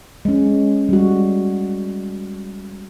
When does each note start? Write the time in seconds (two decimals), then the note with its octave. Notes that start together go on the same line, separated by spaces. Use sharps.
0.25 G#3 C#4
0.89 G3 F#4